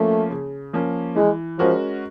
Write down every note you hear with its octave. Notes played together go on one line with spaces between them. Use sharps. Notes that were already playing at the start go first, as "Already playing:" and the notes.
Already playing: F3 A3 A#3 C#4
C#3
F3 A#3 C#4
E3 G#3
F3 G#3 C#4 F#4 A#4